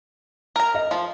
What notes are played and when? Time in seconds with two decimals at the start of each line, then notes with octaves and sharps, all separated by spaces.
0.56 A#4 A#5
0.75 D#5
0.91 F3